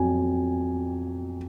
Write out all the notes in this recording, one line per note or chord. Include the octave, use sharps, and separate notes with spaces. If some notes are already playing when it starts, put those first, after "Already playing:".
Already playing: F2 F#3 G#5